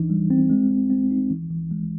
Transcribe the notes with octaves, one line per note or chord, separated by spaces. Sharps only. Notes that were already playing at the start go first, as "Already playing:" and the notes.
Already playing: E3 D4 D#4
G3
C4
G#3
G#3
C4
D#4
E3
E3
G#3